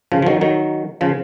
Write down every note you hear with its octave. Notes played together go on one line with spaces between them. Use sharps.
C#3 F3
F3
D#3 F#3
D#3 F#3
C#3 F3